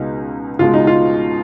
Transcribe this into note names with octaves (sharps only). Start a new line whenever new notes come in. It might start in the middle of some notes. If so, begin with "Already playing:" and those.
Already playing: C#2 B2 G#3 D#4
C#2 B2 G#3 F4
D#4
F4